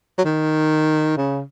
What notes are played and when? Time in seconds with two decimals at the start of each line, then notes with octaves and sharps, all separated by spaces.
0.18 F#3
0.25 D#3
1.17 C#3